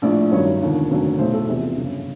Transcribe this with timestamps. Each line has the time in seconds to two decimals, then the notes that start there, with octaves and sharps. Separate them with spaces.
0.02 A#1 A2 F3 D5
0.31 A1 G2 D#3 F#3 C#5
0.60 E1 D#2 D3 F3
0.91 F1 D#2 D3 F#3
1.19 B1 A2 F#3 C5
1.33 A4
1.48 E2 C3 F3
1.77 G1 F#2 C#3